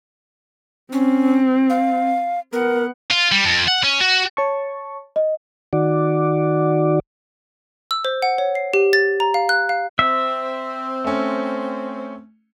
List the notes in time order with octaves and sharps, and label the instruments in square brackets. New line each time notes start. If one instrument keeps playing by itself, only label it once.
[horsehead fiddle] C4 [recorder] C#4
[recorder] F5
[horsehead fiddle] B3 F#5 [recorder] A#4
[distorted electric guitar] F4
G3
F2
F#5
C#4
F#4
[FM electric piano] C#5 A5 C#6
[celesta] D#5
[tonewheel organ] D#3 F#4 D5
[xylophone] E6
C5
F#5
C#5
C7
G4
A6
A#5
F5
F#6
F5
[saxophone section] C4 [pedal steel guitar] E5
[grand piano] A3 C#4